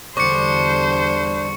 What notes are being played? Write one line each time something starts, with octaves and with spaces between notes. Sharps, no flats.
E2 D3 G3 D4 C5 C#6 C#7